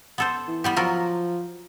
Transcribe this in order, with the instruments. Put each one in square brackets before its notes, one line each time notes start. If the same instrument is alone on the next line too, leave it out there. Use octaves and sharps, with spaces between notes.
[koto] B3 A4 C5
[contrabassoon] E3
[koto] G3 B3 G4
[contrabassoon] F3 [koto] F#3 F4 A#4